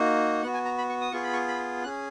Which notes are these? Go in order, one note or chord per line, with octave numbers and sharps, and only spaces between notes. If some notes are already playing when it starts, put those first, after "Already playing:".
Already playing: A#3 D#4 F#4
B3 F#4 F#5
G#5
A#5
B5
C#6
D#6
B3 F4 G#4 C#6
B5
C#6
B5
C#4 G#4 F#6